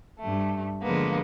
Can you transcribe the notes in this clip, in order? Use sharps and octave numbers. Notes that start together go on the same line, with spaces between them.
G2 A3
D3 F3 G#3 A#3 B3